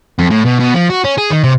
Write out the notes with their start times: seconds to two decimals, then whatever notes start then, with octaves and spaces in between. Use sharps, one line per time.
0.19 F2
0.31 A2
0.45 B2
0.60 B2
0.75 F3
0.90 F#4
1.04 C#4
1.18 G#4
1.30 D#3
1.44 C3